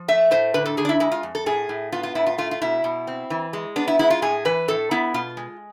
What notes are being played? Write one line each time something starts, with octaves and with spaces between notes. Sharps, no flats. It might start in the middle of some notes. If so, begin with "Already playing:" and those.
Already playing: F3
A3 E5
A2 C5
D3 B4
A4
D3 G#4
D4
E4
G#3 E4
F4
F2
A4
A2 G#4
A2
B3 F4
F4
A2 E4
F4
A3 F4
F4
B2 E4
B2
C4
E3
G#3
B3 D4
E4
G#3 E4
F4
A2 G#4
E3 B4
A2 A4
B3 E4
B2 F4
G#3